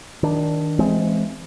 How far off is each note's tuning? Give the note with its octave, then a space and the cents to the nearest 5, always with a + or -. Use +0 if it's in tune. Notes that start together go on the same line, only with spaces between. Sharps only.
D#3 +10 D4 +0
E3 +25 G#3 +20 C4 +0